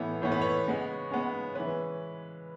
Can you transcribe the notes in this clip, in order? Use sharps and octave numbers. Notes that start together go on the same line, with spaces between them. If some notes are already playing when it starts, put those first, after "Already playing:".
Already playing: A2 E3 B3 C#5
A2 E3 B3 C#5
B4
C#5
C#3 G#3 B3
C#3 G#3 B3
E3 G#3 C#4 B4